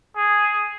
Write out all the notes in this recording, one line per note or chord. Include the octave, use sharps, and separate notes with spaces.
G#4